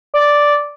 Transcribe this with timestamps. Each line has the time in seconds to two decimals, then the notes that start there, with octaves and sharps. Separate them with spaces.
0.14 D5